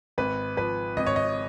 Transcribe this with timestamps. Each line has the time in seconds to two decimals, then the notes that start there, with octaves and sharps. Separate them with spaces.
0.18 G#1 B4
0.57 F3 B4
0.97 G#1 D#5
1.06 C#5
1.16 D#5